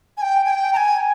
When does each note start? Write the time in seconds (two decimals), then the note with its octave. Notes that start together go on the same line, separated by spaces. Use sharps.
0.17 G#5
0.22 G5
0.46 G#5
0.50 G5
0.73 A#5
0.77 G#5